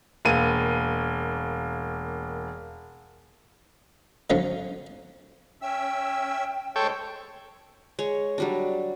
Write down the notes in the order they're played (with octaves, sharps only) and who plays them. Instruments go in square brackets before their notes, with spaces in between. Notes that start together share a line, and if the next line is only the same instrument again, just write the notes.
[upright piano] E1 A#3 D#7
[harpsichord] D3 F3 F#3 C#4
[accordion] C#4 E5 E6 [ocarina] G5
[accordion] D2 G#3 C5 [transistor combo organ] A4 C#5 G5
[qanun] G#3 C#5
F#3 G3 D4